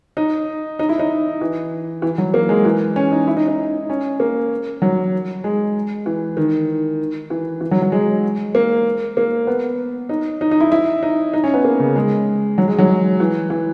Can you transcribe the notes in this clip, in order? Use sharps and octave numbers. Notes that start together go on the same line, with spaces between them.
D#4
D#4
E4
D#4
E3
E3
F#3
A#3
G#3
E3
C#4
D#4
E4
D#4
D#4
C#4
A#3
F#3
G#3
E3
D#3
E3
E3
F#3
F#3
G#3
A#3
A#3
B3
D#4
D#4
D#4
E4
E4
D#4
D#4
C#4
B3
A#3
C#3
G#3
F#3
G#3
F#3
E3
E3